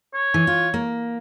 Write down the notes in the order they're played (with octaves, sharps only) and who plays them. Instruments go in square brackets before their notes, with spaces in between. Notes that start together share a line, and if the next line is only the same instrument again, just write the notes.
[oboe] C#5
[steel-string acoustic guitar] E3
F4
A#3